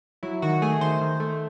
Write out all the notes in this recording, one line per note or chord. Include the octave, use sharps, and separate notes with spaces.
F#3 E4
D#3 F#4
A3 G#4
D#3 C5
D#3
A3